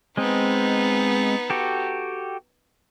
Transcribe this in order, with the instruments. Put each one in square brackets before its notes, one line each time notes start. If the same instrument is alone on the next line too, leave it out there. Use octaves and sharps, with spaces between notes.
[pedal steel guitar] G#3 C4 D#5 [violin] B3 D#4
[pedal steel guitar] F#4 G4 A4